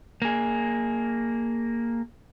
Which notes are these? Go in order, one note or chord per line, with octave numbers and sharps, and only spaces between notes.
A#3 G#4